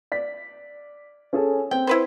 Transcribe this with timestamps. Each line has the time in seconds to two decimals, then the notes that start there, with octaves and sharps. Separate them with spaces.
0.12 D5 B6
1.33 C#4 G#4 A4
1.71 C4 G5
1.87 E4 B4 C5